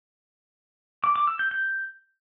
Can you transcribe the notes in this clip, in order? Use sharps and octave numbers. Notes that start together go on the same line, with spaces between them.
D6
D6
E6
G6
G6